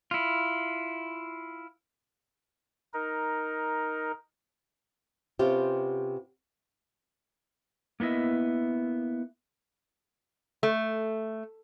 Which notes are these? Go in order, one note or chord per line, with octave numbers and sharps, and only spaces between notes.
E4 F4
D#4 A#4
C3 B3 C#4 F4 G4
A#3 B3 E4 D#5 E5
A3